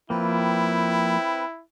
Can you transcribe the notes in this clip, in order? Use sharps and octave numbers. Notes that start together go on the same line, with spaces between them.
F3 A#3 C4 E4 B4 G5